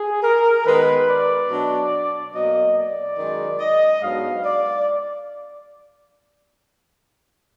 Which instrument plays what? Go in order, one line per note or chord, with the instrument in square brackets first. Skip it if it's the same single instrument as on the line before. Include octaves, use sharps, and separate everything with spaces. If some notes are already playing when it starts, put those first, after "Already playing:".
Already playing: [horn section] G#4
A#4
D#3 G#3 B3 B4
D5
B2 F#3 D4
B2 F#3 A#3 D#5
D5
F#2 D#3 G#3 D#4
D#5
G#2 F#3 B3 D4 F5
D5